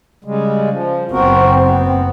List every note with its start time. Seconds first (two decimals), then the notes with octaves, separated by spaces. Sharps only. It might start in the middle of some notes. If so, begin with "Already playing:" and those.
0.24 C#3 G3 G#3
0.70 F3
1.12 F#1 B3 C4 F#4 A#4
1.59 B3